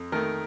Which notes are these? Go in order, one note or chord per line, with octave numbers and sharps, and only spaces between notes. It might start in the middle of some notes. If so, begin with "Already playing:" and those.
Already playing: F2
D#3 A3 A#4